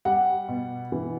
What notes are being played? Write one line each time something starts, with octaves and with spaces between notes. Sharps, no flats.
G3 F#5
B2
E3